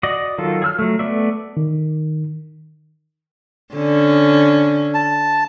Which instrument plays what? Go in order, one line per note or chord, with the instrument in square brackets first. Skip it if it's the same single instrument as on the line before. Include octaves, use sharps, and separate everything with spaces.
[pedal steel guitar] F#4 D5 D#5
D#3 F#3 F4 A4
G#4 E6 F6
F#3 A3
A3 B3 D5 E5
[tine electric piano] D#3
[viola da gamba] D3 C#4
[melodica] A5